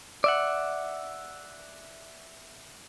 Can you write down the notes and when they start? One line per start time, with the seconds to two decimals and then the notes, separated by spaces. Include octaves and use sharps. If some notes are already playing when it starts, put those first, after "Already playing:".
0.24 D5 E5 F#5